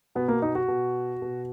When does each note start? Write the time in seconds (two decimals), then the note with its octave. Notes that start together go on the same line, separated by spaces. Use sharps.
0.15 B2 B3
0.28 A#3
0.42 D#4
0.55 F#4
0.68 B2
1.22 B2